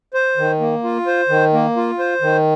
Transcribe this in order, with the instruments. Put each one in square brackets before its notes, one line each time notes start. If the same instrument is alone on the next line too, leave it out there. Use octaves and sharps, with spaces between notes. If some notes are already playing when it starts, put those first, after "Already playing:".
[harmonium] C5
D#3
A#3
F4
C5
D#3
A#3
F4
C5
D#3